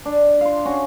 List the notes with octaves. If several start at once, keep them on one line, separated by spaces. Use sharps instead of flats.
D4
F5 C6
C#4 F#4